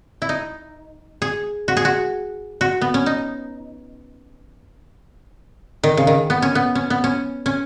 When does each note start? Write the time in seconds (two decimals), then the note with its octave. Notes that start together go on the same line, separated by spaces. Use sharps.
0.22 E4
0.29 D#4
1.22 G#4
1.68 F#4
1.77 G#4
1.85 F#4
2.61 F#4
2.81 B3
2.94 C#4
3.06 D#4
5.83 D#3
5.97 C#3
6.07 D#3
6.30 B3
6.42 C#4
6.55 B3
6.75 C#4
6.90 B3
7.04 C#4
7.46 C#4